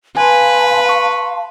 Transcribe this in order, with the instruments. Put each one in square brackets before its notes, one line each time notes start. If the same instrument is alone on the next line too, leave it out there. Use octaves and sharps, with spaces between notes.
[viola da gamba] B4 [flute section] F5 A5 C6 [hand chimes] G#5
[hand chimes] C#6